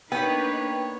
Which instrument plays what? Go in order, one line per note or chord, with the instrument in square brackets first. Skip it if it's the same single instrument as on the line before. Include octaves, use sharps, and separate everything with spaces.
[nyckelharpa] A#3 C#5 [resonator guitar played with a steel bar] B3 [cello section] D4 D#4 B4 [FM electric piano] G5